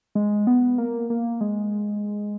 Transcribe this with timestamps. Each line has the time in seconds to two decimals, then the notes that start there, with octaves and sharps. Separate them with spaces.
0.15 G#3
0.47 B3
0.78 A#3
1.10 A#3
1.41 G#3